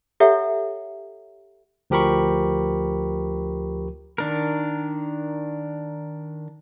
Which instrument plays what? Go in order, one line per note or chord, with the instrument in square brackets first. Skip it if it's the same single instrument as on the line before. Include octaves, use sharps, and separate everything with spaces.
[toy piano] G4 A4 C#5 E5 F#5 A#5
[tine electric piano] D2 F3 G4 A#4 B5 C#6
[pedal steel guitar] D#3 D4 A#4